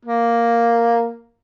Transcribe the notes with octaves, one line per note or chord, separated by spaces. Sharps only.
A#3